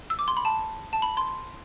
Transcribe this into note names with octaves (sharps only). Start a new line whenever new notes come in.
E6
D6
C6
B5
A5
A5
B5
C6